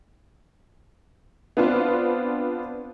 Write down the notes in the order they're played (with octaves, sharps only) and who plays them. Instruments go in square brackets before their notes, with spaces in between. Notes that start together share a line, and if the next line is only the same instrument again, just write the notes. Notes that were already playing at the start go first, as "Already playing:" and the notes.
[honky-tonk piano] B3 C4 D4 F4